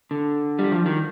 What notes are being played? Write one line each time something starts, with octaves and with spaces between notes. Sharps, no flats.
D3
G3
F3
D#3